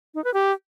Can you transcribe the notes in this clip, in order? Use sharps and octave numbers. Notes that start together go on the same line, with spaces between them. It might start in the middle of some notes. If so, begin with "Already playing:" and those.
D#4
B4
G4